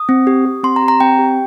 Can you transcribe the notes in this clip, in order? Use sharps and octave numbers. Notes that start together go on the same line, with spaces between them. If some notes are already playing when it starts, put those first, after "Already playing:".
Already playing: D#6
C4
G4
G4
C4 C6
A#5
G4
A#5
C4 G5
G4